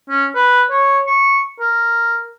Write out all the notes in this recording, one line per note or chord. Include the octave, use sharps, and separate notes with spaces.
C#4
B4
C#5
C#6
A#4